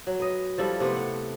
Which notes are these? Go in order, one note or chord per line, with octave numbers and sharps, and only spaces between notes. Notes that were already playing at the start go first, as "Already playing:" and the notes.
F#3
B4 D#5
F3 G3 E4 A4
C3 A3 B3 C5
F#5